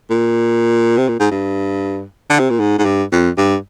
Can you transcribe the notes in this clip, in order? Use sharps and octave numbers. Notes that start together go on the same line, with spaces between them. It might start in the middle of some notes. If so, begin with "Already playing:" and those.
A#2
C3
A#2
G#2
G2
D3
C3
A#2
G#2
G#2
G2
F2
G2